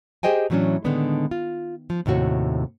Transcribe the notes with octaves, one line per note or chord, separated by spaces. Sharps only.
G4 G#4 C5 D#5 G5 G#5
A2 E3 F#3 B3 C#4 D4
A2 D3 D#3 G#3 B3 D4
F4
F3
D#2 A2 C3 F#4 C#5